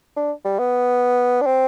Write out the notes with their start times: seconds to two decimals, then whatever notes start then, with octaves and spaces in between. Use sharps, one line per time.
0.17 D4
0.45 G3
0.59 B3
1.41 D4
1.46 C4